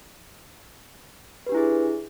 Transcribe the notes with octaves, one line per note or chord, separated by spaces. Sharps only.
D4 E4 G4 G#4 B4